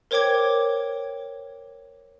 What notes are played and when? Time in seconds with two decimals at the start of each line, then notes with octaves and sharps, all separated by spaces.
0.11 A#4 C5 C#5 G5 D6 G#6